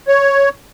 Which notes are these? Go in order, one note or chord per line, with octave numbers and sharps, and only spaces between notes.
C#5